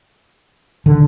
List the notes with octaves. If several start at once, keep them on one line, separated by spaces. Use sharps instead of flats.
D3